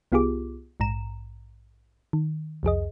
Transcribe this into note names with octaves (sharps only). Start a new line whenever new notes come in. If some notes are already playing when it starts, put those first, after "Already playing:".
C2 B3 F4 G4 G#4 D6
A#1 G#2 A#5 E7
D#3
C2 F2 G#4 D#5